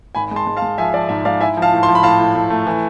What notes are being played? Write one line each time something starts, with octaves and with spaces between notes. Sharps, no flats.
G#1 G#5 B5
G#3
A5 C6
G#3
F5 A5
G#3
F3 E5 G#5
F3 D5
G#2 E5
G#2 D5 F5
E4 E5 G#5
F3
F5 A5
A2
A5 C6
F3
B5
A2 F5 A5
A2
A2
A3
E3